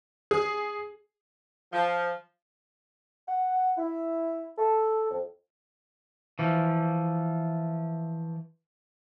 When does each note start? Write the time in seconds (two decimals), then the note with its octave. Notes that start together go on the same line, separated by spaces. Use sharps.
0.31 G#4
1.73 F3
3.28 F#5
3.77 E4
4.57 A4
5.10 F2
6.39 E3 F3